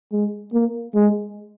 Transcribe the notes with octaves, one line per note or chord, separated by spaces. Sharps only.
G#3
A#3
G#3